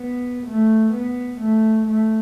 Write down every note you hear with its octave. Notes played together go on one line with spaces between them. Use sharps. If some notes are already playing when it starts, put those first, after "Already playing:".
Already playing: B3
A3
B3
A3
A3